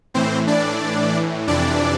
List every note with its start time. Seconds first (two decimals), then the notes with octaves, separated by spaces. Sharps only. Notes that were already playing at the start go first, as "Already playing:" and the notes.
0.14 A2 E3 C4 C5
0.47 D4 D5
1.47 F2 C3 E3 D4 D5